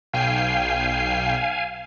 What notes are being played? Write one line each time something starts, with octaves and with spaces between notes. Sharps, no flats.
B1 F5 G5 G#5 C7